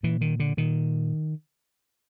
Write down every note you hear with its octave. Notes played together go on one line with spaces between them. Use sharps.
A#2 E3
D#3
D3
A#2 D#3